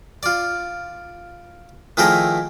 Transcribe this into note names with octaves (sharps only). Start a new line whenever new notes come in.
F4 D5
D#3 F3 A3 E4 G#4 A#4